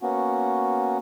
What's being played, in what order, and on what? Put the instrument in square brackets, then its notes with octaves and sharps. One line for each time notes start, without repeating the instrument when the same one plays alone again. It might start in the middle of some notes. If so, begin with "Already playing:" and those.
[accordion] A#3 B3 C#4 F#4